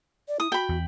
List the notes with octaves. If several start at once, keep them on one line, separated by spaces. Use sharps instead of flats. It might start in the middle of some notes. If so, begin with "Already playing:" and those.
D5
E4 D#6
F#4 G5 B5
E2